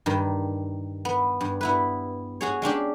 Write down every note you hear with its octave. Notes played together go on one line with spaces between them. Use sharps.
G2 D#3
B3
G2
B3 E4 B4
F#4 G#4 C#5
G#3 C#4 D4 G4